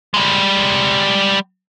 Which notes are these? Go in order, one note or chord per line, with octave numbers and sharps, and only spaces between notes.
G3 G#3